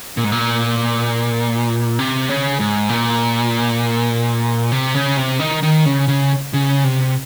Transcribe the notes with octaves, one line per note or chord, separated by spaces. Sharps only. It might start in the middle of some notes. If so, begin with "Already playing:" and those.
A#2
G#2
A#2
C3
C#3
G#2
A#2
C3
C#3
C3
D#3
D#3
C#3
C#3
C#3
C3